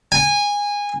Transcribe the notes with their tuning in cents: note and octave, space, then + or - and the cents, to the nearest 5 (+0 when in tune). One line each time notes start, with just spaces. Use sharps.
G#5 -20